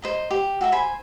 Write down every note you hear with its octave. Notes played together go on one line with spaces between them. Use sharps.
C5 D#5 A#5
G4
F#4 A4 E5 A#5
C5 G#5 B5